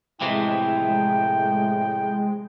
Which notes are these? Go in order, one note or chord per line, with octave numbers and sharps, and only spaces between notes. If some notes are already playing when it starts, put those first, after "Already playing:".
A2 C3 E3 F3 G#3 E4 G5